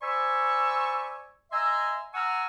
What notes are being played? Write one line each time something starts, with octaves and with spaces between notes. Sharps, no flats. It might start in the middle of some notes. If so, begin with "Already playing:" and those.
C5 D5 G#5 B5 C#6 E6
D#5 E5 G#5 A#5 C6 E6
F#5 G#5 A#5 C#6 E6 F6